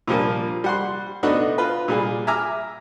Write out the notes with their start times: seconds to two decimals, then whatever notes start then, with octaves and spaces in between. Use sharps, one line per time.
0.08 A#2 F3 G3 A#3
0.64 G3 F#5 C6
1.23 A3 B3 D4 D#4 F#4
1.58 F4 B4
1.88 A#2 G3 G#4
2.27 E5 G#5 A#5 D6 E6 F6